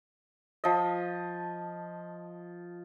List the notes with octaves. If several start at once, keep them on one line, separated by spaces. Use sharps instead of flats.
F3 D#5